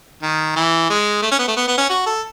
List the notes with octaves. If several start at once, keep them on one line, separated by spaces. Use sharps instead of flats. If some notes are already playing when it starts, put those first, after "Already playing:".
D#3
E3
G#3
A3
C#4
B3
A3
B3
B3
C#4
F#4
A4